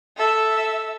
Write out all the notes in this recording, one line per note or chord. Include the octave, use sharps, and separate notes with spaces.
A4 E5